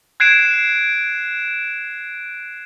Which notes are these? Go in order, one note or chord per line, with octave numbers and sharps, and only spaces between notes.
F#6 G#6 C7 D7 E7